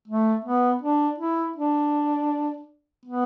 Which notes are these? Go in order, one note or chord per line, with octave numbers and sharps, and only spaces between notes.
A3
B3
D4
E4
D4
B3